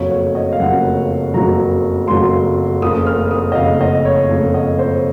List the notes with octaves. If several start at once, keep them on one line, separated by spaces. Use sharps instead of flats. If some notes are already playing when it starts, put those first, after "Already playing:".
Already playing: F#1 F2 C#3 F#3 C#5
C#5
D#5
F5
F#1 F2 C#3 F#3 F#5
F#1 F2 C#3 F#3 A#5
F#1 F2 C#3 F#3 C6
F#1 F2 C#3 D#6
F6
D#6
D#5
F#1 F2 C#3 F5
D#5
C#5
F#1 F2 C#3
D#5
C5